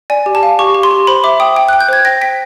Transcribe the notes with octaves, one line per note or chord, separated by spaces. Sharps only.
D5 G#5
G4
A5
F5
G4 C#6
G4
C6
G4
C5 B5
E5 D6
G5 D#6
G5
F#6
G5
G6
C5 G#6
G5 A#6
G5 B6